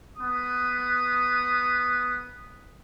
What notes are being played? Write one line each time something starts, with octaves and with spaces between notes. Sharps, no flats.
B3 D#6